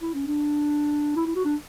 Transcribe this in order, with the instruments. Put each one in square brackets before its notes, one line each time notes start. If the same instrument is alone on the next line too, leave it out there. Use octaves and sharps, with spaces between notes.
[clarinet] E4
C#4
D4
E4
E4
F#4
D4